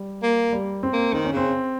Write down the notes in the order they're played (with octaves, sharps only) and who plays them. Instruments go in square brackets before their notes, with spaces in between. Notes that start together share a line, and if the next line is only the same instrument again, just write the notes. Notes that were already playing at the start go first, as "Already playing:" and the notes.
Already playing: [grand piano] G3
[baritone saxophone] A#3
[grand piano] G3
C4
[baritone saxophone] A#3
[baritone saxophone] D#3 [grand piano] C4
[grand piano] C#4
[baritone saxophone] C#3 [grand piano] C4